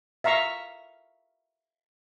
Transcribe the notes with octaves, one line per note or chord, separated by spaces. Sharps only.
E5 F5 A#5 C#6